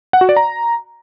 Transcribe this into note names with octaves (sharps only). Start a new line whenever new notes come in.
F#5
F#4
D5
A#5